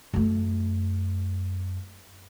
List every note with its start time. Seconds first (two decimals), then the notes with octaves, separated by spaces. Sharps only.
0.14 F#2 A3